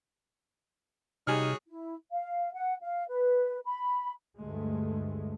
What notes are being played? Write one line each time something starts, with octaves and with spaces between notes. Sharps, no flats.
C3 G3 D#4 F#4 G#4 C#5 G#5 F6
E4
F5
F#5
F5
B4
B5
D2 G2 G#3 A3